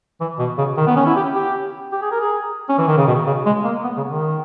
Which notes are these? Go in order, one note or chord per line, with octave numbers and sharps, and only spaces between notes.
E3
B2
C#3
D#3
B3
C#4
E4
G4
G4
G4
G#4
A#4
G#4
C#4
E3
D#3
C#3
B2
C#3
G#3
A#3
B3
C#3
D#3